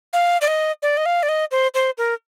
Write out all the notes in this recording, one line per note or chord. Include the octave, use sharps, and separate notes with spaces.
F5
D5
D#5
D5
D#5
F5
D5
D#5
C5
C5
A#4